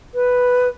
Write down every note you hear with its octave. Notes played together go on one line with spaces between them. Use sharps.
B4